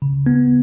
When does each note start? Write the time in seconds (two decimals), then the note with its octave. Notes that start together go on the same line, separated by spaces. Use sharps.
0.02 C#3
0.26 B3